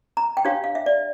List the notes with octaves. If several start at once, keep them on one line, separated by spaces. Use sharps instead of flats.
A#5
G5
D4 G4 C#5 F5
F5
E5
D5